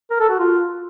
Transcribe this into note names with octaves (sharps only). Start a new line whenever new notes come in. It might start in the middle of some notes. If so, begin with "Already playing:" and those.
A#4
A4
F#4
F4